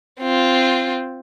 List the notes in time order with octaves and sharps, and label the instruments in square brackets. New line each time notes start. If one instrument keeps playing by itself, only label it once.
[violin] C4 F4